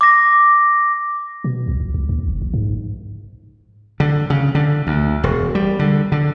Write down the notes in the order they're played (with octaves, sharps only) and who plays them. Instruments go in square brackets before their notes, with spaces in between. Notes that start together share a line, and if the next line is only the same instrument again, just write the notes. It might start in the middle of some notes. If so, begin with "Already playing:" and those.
[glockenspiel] D6 A#6
[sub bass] B2
C2
A#1
C#2
D#2
F#1
A#1
G#2
[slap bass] D3
C#3
D3
D2
E1
G3
D3
D3